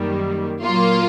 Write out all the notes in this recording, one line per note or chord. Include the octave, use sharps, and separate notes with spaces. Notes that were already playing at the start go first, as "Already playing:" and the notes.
Already playing: F#2 D#3 G3 A#3
A#2 F#3 A#3 F4